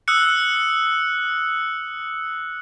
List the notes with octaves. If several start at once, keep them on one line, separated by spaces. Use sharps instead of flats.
D#6 E6 F#6 C#7